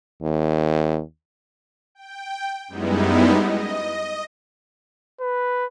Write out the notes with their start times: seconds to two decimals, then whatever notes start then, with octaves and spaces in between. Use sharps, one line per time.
0.23 D#2
1.95 G5
2.68 F#2 G3 G#3 B3 D#4 E4
3.34 D#5
5.21 B4